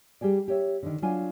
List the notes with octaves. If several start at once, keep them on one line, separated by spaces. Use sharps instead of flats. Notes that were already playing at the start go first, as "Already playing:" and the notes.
G3 G4 G#4 D5
G4 C#5 E5
D3 D#3
F#3 D4 F4 G#5